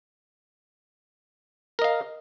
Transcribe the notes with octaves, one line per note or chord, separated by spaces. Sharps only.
A#4 D#5 F5